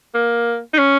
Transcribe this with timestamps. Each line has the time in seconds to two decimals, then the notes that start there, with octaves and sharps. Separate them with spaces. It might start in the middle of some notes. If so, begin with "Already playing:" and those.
0.14 A#3
0.74 D#4
0.78 C#4